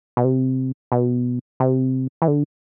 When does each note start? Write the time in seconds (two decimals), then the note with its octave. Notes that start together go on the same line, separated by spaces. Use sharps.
0.17 B2
0.24 C3
0.92 B2
1.60 C3
2.22 E3
2.28 D3